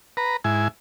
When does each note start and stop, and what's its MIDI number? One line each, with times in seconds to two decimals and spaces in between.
0.17 0.37 71
0.17 0.37 82
0.44 0.68 44
0.44 0.68 64
0.44 0.68 80